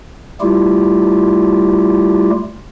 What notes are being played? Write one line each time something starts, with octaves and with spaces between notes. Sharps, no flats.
G3 A3 E4 F4 G4